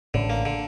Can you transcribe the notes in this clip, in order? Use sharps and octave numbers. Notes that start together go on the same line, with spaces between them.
A1 A2 D3
A#3
D3